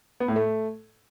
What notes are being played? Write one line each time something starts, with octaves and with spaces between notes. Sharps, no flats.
B3
A2
A3